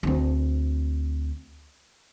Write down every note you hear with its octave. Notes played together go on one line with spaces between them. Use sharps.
D2 C4